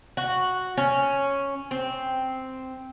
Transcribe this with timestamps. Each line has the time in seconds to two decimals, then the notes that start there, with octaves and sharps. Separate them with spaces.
0.17 F#4
0.77 C#4
1.71 C4